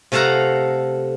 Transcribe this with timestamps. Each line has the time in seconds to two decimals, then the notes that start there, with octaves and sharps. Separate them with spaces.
0.12 C3 A3 A4 F5 F#5 A#5